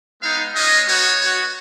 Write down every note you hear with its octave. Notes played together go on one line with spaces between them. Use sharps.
G#3 B3 D#4 F5
G#3 C#4 F4 D#5
B3 D#4 F#4 C#5
B3 F#4